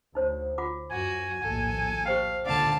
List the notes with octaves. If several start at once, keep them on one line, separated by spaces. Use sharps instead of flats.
D2 D#4 C5 C#5
F4 F#5 D6
F#2 F#4 G#5
A#1 D#2 A2 A4
G4 C5 F5 G5
C#2 A#2 D3 D5 F5 A5